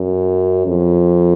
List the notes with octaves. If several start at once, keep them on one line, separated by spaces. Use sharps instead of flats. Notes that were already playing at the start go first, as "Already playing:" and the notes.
Already playing: F#2
F2